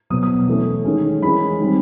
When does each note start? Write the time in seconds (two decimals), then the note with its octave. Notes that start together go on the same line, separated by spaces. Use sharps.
0.10 B2 F#3 B3 D#6
0.23 D#6
0.48 E3 A3 C#4
0.85 D#3 G#3 C#4
1.22 E3 G#3 C#4 B5
1.60 D#3 G3 C4